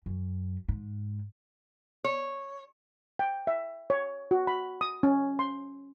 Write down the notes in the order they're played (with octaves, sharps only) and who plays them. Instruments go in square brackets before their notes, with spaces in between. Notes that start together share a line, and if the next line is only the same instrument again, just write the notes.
[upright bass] F#2
G#2
[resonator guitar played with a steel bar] C#5
[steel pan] G5
E5
C#5
F#4
B5
D#6
C#4
C6